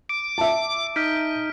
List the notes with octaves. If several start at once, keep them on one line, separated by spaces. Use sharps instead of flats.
D6 D7
E5 A5
D#4 F6 B6 D7